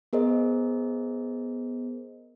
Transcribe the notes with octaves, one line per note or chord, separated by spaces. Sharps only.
B3 G#4 A#4 C5 D#5